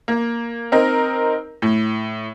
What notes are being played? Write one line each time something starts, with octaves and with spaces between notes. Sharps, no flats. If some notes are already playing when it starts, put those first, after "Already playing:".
A#3
C4 D#4 A#4
A2